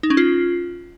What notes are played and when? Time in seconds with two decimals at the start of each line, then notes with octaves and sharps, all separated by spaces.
0.03 D#4
0.10 C#4
0.17 F4